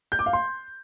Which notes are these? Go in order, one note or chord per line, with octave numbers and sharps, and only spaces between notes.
G6
D6
F5
C6